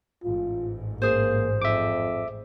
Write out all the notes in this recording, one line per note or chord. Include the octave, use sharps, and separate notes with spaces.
A1 G#2 F4
A#3 G#4 C5
F2 E5 D6